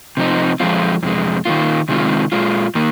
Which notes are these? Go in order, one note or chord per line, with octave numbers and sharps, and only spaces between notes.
C3 F3 C4 D#4
F2 F3 G#3 C4 F4
F2 C3 G#3
D#3 A#3 F4
C3 D#3 G#3 C4 F4
A#2 G#3 F4
D#3 A#3